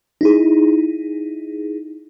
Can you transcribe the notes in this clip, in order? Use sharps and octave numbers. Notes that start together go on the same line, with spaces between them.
D#4 E4 G#4